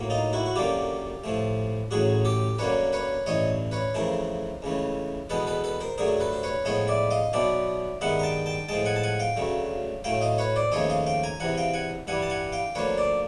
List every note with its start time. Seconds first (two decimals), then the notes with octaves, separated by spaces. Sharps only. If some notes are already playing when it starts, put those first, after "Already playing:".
Already playing: A2 F#3 A#3
0.10 D#4 F4
0.33 E4 F#4
0.46 F#4
0.56 F#2 D3 F#3 A#3 F4 G4
1.24 A2 F3 A3
1.91 A1 A2 F#3 F#4 G#4
2.25 G4 A4
2.59 F#2 D3 F#3 A#3 B4 C#5
2.93 B4 C#5
3.26 A1 G2 E3 C#5 D#5
3.71 B4 C#5
3.94 F2 C#3 E3 A3 A#4 C5
4.62 C#2 C#3 E3 A3
5.30 E2 B2 G#3 B3 A4 B4
5.47 A4 B4
5.64 A4 B4
5.81 A#4 C5
5.98 G2 D3 F#3 A3 G#4 A#4
6.20 A4 B4
6.33 C5
6.43 B4 C#5
6.65 A2 F3 G#3 B3 C#5 D#5
6.88 D5 E5
7.11 D#5 F5
7.33 B1 B2 F#3 B3 D5 E5
8.01 G2 D#3 G#3 B3 E5 F#5
8.19 A#5
8.23 G5 A5
8.46 G5 A5
8.68 A2 F3 G#3 G5 A5
8.86 F#5 G#5
8.96 A5
9.03 F#5 G#5
9.20 F5 G5
9.37 D2 C#3 F#3 A3
10.04 A2 F#3 A3 F5 G5
10.21 D#5 F5
10.38 B4 C#5
10.56 C5 D5
10.72 D#2 C#3 F3 A3 C#5 D#5
10.90 D#5 F5
11.06 F5 G5
11.23 G#5 A#5
11.40 E2 C3 E3 F#5 G#5
11.58 F5 G5
11.74 F#5 G#5
12.07 G2 E3 G3 F#5 G#5
12.23 A5
12.30 F#5 G#5
12.52 F5 G5
12.75 D2 D3 F3 A#3 B4 C#5
12.98 C5 D5